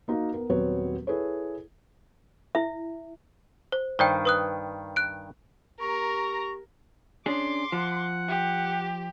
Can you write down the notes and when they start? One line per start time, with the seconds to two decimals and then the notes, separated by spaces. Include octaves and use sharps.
0.08 A#3 D#4 F#4 F5
0.34 B3 A#4
0.49 D#1 F#3 B3 C4 B4 C#5
1.07 E4 G#4 A4 B4 C#5
2.55 E4 E5
3.72 C5
3.99 G2 D#3 C5 D5 G5
4.25 B4 D#6 F#6
4.96 F#6 D7
5.80 A#3 G4 A#4 A#5 C#6
7.26 C#4 D4 G#4 C6 D6
7.72 F3 F#5
8.28 G4